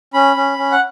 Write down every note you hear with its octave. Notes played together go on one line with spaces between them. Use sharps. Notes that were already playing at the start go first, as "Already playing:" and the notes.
C#4 B5
C#4
C#4
F#5